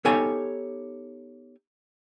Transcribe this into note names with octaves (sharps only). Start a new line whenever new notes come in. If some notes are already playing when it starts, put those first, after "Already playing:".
B3 D#4 G4 A4 C#5 G#5